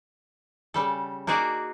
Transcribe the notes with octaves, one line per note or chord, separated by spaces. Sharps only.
C#3 G3 A4
A#3 D#4 F#4 G#4 D5